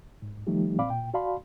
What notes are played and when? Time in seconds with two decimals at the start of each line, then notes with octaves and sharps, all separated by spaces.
0.22 G#2
0.47 D#3 F3 G3 A3 D#4 G4
0.78 A#2 C4 D5 F5 B5 D6
0.90 A#2 G5
1.14 F#4 D5 F5 A5 B5 C6